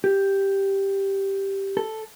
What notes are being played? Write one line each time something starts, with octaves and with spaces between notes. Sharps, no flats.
G4
A4